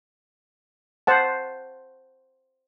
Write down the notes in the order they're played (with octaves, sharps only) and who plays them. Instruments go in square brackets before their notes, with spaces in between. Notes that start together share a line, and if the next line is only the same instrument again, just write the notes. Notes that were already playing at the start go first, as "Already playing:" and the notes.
[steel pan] C5 F#5 A5